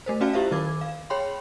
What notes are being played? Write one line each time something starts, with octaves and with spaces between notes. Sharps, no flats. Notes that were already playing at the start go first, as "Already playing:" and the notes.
A3 A#4 C5
C#4 F#4 D5 F5 A5
E4 F4 G4 C5 E5 F5
D#3 F#3 A#4 D6 G#6
F5
G#4 C#5 G5 B5 C6